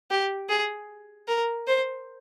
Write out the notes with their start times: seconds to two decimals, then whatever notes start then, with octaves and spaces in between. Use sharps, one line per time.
0.11 G4
0.49 G#4
1.28 A#4
1.67 C5